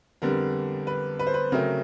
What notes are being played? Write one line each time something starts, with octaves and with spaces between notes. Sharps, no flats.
F2 D3 G3 B3 A#4
B4
B4
C5
B4
C#3 F#3 A3 C4 A#4